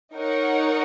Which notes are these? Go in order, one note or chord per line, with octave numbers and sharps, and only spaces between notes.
D#4 A#4 C#5 F#5